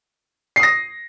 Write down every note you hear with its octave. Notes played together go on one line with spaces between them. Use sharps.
D#6 A#6 C7